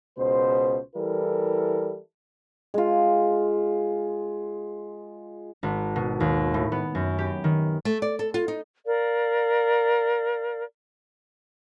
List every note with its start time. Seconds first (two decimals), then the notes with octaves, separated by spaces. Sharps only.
0.18 C#2 B2 C5
0.96 E3 G3 E4 A4 A#4
2.74 G#3 F4
5.63 G#1
5.96 B2
6.20 D#2
6.54 A2
6.72 B3
6.95 F#2
7.19 G4
7.44 D#3
7.85 A3
8.02 D5
8.19 A4
8.34 F4
8.48 D#4
8.85 A#4 D5 F5